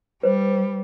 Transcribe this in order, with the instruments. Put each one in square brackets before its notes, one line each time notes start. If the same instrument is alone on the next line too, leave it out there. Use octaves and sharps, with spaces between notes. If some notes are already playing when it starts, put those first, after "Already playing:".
[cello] G3 [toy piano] B4 C5